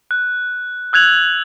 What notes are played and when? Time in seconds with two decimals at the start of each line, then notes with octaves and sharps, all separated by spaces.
0.11 F#6
0.93 E6 F#6 G#6 F7 F#7